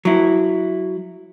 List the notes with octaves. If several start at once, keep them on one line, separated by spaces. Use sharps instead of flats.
F#3 E4